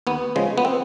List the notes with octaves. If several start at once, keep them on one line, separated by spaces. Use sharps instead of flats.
D#2 B3
C#3 F3 G#3
B3
C4